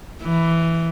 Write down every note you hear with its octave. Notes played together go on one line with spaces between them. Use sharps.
E3